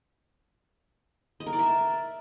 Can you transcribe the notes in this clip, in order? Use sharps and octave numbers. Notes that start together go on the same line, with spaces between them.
D#5
A#4
D5
E5